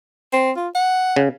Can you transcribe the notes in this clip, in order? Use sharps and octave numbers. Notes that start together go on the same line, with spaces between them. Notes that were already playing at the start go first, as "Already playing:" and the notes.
C4
F4
F#5
C#3